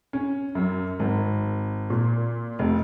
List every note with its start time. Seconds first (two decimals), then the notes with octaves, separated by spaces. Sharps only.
0.13 C#4
0.55 F#2
0.99 G#1
1.90 A#2
2.59 F1